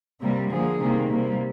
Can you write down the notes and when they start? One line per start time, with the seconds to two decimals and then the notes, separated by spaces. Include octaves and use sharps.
0.20 C3 G3 A#3
0.50 D3 F3 A#3 G#4
0.79 C3 D#3 G3 A#3
1.08 C3 G3 A#3